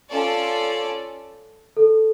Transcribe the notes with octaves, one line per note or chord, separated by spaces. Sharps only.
C#4 F4 A4 D5
A4